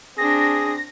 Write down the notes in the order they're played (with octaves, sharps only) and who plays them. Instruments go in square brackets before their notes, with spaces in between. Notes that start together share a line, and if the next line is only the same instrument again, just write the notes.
[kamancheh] C4 D4 [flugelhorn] G#4 [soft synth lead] A#6